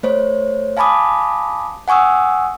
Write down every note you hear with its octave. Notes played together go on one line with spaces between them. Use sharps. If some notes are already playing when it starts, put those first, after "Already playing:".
A3 C5 C#5
F5 G#5 A5 B5 D6 D#6
F#5 G#5 C#6 D#6 E6